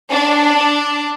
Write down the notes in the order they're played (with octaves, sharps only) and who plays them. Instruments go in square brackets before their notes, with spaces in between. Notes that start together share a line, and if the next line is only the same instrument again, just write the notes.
[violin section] D4